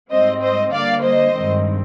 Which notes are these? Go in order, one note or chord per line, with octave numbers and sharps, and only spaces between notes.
G#2 G3 C4 C5 D#5
C5 D#5
D3 G3 A#3 D5 F5
C5 D#5
G2 D#3 G#3 C4